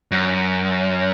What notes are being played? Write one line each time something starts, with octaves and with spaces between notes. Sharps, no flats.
F#2